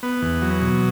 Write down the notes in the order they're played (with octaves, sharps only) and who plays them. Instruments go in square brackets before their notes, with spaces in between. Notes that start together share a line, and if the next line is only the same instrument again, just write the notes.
[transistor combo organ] B3
E2
F#3
B2